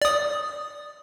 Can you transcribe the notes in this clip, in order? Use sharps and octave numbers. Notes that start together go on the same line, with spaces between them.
D5 D#6